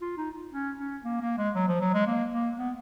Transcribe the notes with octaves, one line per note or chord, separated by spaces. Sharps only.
F4
D#4
C#4
C#4
A#3
A#3
G#3
F#3
F3
F#3
G#3
A#3
A#3
B3